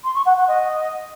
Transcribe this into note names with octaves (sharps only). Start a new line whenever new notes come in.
C6
C#6
F#5
F#5
D#5